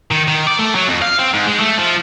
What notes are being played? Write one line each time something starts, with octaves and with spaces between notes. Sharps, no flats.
D#3
D#3
D5
A3
F#3
F2
F5
C4
G#2
G#3
A3
F3